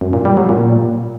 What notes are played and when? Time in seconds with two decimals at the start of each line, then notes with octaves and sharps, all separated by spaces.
0.01 F#2
0.13 A#2
0.25 G3
0.37 F#3
0.49 A#2